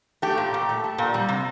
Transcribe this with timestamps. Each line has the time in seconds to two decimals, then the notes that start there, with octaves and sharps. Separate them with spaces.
0.22 A3 G4
0.38 A#2
0.54 A#2
0.69 A3
0.84 A3
0.98 A#2
1.14 G3
1.29 C3